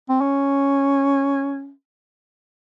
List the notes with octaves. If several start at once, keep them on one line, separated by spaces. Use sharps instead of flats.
C4
C#4